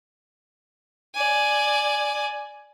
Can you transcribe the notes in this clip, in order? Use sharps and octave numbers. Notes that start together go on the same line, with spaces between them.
D5 G#5